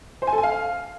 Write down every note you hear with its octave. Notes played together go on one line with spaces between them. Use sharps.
C5
G#5
A4
G#5
F5